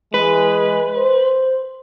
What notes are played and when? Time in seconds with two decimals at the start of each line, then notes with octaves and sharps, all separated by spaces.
0.14 E3 G#3 B4
0.97 C5